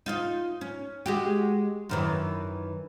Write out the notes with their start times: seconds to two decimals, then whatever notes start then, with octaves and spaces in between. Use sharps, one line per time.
0.06 D#4 F4 D#5
0.61 C#4
1.06 G#3 F#4 G4
1.89 F#2 D#3 E3